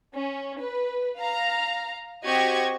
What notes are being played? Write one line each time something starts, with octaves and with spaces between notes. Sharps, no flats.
C#4
B4
F5 A#5
C4 F#4 G4 D#5 C#6 G#6